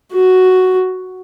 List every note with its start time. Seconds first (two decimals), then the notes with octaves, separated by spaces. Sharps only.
0.13 F#4